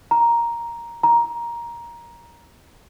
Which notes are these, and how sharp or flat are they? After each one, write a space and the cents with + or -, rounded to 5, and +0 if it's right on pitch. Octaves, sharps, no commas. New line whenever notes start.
A#5 +5
A#5 +15